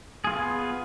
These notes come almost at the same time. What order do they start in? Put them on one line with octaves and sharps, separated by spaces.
G#4 F4 B3